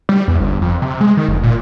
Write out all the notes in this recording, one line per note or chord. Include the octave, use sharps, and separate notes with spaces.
G3
E2
G1
F2
C3
G#3
D#3
F1
A#2